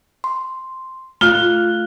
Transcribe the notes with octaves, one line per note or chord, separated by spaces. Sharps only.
C6
A3 F4 F5 F6 F#6 G7